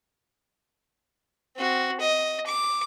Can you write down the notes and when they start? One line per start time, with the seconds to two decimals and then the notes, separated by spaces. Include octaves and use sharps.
1.56 C4 F#4
2.01 D#5
2.47 D6